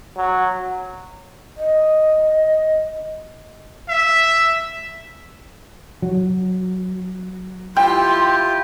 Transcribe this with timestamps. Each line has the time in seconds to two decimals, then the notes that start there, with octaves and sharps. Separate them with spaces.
0.17 F#3
1.56 D#5
3.89 E5
6.02 F#3
7.77 E4 F4 G4 G5 C6